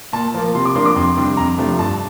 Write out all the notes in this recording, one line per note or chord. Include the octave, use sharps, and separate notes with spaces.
A#2 A5
F3 A#3
C3 C6
D6
F3 A#3 D4 C6
D6
F2 C6
C3 G3 D4
F2 A#5
C3 F3 A3 D4
G2 A5